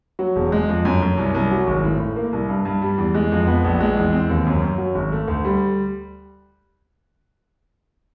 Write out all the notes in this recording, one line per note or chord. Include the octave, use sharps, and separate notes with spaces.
F#3
E1
G#3
F2
F#2
F#2
C2
C2
F#3
G#1
A2
A2
A#3
C2
G2
G2
G3
E2
G#3
F2
B3
A#1
G#3
E2
C4
D#2
F#2
F#2
F#3
G#1
A3
D2
G3